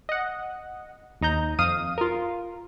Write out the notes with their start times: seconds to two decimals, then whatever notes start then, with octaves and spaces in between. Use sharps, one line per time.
0.09 D#5 F#5
1.21 D#2 D#4 A#5 G6
1.59 F2 F5 D#6 D#7
1.98 F4 A#4